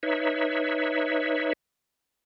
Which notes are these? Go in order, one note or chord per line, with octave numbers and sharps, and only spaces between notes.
D#4 B4 C#5 E5